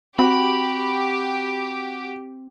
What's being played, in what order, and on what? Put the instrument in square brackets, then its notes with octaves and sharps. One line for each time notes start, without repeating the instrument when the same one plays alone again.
[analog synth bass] C4 [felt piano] F#4 [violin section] G4 [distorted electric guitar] B5